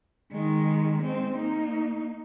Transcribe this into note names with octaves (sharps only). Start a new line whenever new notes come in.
D#3 G#3
G#3 C4
A#3 D#4